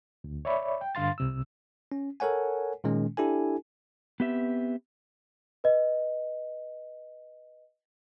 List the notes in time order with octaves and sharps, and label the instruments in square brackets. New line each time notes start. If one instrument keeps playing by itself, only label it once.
[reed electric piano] D2
C#5 D5 E5 B5
G5
G2 D3 F5 C6 A6
C2 C3 E6
[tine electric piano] C#4
A4 A#4 C#5 F#5 G#5
A#2 D#3 G#3 C#4
D4 E4 G4 A4 G#5
[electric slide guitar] B3 C4 G4 B4 E5
[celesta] B4 D#5